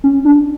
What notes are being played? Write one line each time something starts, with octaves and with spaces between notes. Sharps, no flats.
C#4
D4